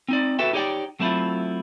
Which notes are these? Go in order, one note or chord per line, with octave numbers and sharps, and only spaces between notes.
C4 D#4 D5
F#4 A4 B4 E5 G5
D#4 G4 C#5 D5 G5
F#3 A3 C4 E4 F4